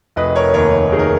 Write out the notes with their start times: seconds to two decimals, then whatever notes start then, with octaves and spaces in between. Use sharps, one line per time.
0.16 F1 B4 D#5
0.36 A#4 C#5
0.54 D#2 A#4 C#5
0.92 D#3 G#4
0.99 A#4